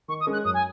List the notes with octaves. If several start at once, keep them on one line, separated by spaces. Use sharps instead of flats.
D#3 C#6
D#6
G#3 C#4 A#4
F#6
F#2 D#6
G#5